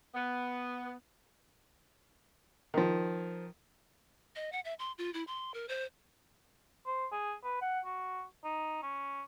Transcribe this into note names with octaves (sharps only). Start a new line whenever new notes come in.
B3
D#3 F3
D#5
F#5
E5
C6
F4
E4
C6
A#4
C5
C5
G#4
B4
F#5
F#4
D#4
C#4